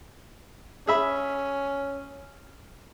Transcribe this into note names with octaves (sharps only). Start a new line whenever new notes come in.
C#4 G#4 E5 B5